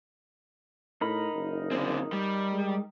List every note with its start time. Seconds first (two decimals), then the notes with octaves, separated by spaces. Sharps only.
1.01 A2 D#4 A#4 B5
1.33 F#1
1.71 D3 C4
2.12 G3
2.53 G#3